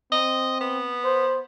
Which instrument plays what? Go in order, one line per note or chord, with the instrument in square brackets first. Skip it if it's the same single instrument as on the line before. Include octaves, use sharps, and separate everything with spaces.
[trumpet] C4 [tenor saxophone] D#5
[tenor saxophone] B3
[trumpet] C5